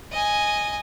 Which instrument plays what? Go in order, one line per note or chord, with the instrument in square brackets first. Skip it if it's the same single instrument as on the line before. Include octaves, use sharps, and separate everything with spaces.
[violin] D#5 G#5